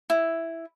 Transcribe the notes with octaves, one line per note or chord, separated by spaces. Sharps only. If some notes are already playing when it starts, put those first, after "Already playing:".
E4